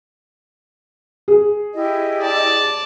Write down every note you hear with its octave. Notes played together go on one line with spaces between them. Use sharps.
G#4
E4 G4 D#5
D5 A5